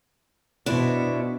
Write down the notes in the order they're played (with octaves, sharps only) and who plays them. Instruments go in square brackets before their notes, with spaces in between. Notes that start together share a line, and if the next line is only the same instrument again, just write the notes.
[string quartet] B2 [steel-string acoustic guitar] D4 E4 C5